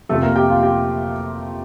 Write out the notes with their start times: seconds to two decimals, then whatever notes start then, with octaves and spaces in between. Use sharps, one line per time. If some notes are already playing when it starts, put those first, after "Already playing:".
0.09 F2 C3 F3 A3 A4
0.22 A#3 A#4
0.36 G4 G5
0.49 F4 F5
0.63 G4 G5